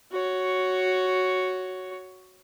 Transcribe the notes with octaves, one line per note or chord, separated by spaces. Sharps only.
F#4 C#5